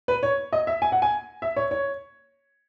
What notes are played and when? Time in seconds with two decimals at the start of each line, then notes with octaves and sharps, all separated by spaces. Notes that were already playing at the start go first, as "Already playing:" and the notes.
0.08 B4
0.23 C#5
0.53 D#5
0.67 E5
0.82 G#5
0.92 F#5
1.02 G#5
1.42 E5
1.56 C#5
1.71 C#5